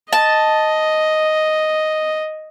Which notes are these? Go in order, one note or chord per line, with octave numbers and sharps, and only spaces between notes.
D#5 A5